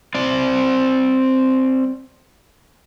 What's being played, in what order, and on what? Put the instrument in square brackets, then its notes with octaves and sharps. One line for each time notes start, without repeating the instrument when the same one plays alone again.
[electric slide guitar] C4 D5